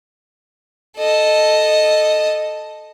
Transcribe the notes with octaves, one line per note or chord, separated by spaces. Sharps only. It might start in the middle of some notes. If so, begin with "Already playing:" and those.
A4 D#5